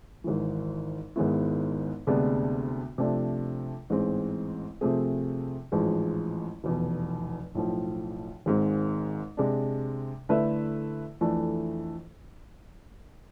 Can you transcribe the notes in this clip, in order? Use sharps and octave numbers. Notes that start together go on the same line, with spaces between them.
G#1 G#2 E3
G#1 G#2 G#3 B3 E4
D2 C3 G#3 B3 D4
C3 F3 A3 D4
A1 G#2 G#3 C4
C3 F3 A3 C4 G#4
A1 G#2 F3 G#3
F1 E2 B2
B1 A2 F3
G#1 G#2 G#3 C4
C3 G#3 D4
D3 A3 E4 B4 E5
F2 E3 A3 D4 A4